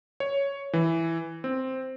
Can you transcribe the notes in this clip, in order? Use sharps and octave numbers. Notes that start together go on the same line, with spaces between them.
C#5
E3
C4